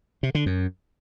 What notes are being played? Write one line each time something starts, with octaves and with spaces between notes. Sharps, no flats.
C3
D3
F#2